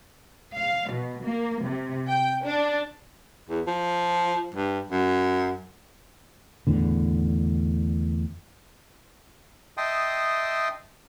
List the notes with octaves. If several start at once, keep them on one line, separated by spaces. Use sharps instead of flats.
F5
B2
A#3
C3
G5
D4
E2
F3
G2
F#2
E2 A2 D3
D#5 E5 G5 A5 C6 D#6